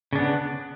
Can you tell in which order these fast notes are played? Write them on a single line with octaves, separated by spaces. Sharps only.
C#3 D4 B3